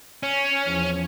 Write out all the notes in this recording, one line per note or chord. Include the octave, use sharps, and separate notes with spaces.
C#4
E2 F3